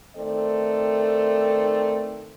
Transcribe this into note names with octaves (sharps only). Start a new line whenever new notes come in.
D#3 A3 C4 A4 D5